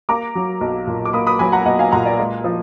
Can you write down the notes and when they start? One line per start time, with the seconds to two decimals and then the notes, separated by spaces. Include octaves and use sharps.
0.09 A#3 A#5 D6
0.35 F#3
0.61 B1
0.87 A#2
1.05 D6
1.13 A#3 B5 D#6
1.27 B5 D#6
1.39 F#3 G#5 B5
1.52 F#5 A#5
1.65 B1 D#5 F#5
1.79 F5 G#5
1.91 A#2 F#5 A#5
2.05 D5
2.18 G#3 D#5
2.44 F3